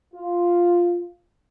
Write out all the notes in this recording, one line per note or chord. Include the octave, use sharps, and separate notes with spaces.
F4